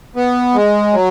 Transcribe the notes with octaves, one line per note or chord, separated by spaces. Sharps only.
B3
G#3
F#3